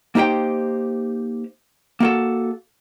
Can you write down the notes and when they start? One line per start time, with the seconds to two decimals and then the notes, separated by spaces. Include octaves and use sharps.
0.15 A#3 D#4 G4 C5 G5
2.00 A#3 F#4 A4